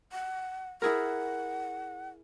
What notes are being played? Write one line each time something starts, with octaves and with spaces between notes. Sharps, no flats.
F#5
E4 G#4 A#4 F#5